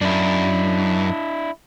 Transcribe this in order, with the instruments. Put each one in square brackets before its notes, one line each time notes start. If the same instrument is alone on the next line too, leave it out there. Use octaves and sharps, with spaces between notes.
[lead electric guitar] F#2 [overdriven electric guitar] D4 E4